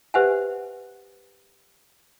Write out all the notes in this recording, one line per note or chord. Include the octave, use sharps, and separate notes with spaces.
G4 B4 C5 E5 F#5 G#5